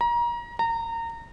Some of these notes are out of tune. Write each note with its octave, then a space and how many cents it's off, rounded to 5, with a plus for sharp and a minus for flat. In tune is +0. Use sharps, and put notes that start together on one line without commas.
A#5 +30
A#5 -25